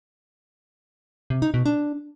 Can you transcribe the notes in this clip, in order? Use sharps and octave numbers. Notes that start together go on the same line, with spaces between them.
C3
D#4
B2
D4